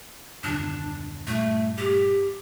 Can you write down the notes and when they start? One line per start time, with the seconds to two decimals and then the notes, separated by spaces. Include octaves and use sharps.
0.44 D#1 F#2 D3 D4
1.27 G2 A#2 A3
1.77 G4